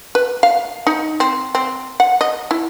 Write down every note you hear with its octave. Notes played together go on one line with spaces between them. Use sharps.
B4
F5
D#4
C4
C4
F#5
D#5
E4